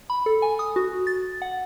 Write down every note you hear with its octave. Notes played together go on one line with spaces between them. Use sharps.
B5
A4
G#5
D#6
F#4
A6
F#5